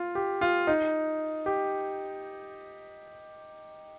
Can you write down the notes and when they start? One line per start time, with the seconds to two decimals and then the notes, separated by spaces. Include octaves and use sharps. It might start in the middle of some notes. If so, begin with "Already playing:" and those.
Already playing: F4
0.15 G4
0.41 F4
0.67 D#4
1.46 G4